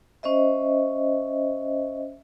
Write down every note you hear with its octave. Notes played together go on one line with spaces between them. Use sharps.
C#4 C5 D#5 E5